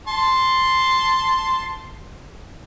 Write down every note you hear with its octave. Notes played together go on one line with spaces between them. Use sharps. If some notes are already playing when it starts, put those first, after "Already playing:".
A5 C6